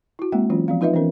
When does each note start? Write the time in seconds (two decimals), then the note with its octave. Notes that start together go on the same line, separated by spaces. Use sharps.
0.19 E4 F#4
0.32 G#3 A#3 C4 F#5 G5
0.50 E3 F#3 G#3 C#4 F4
0.68 F3 C4 F5
0.81 D#4 F4 B4 D#5 E5
0.94 E3 B3 C#4 A#4